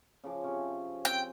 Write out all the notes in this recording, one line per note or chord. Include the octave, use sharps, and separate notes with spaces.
C#3 F3 D6
C3 C#4
C4 G5 G#5